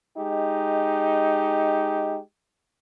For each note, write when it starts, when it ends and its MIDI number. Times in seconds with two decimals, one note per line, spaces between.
0.17 2.19 56
0.17 2.19 63
0.17 2.19 67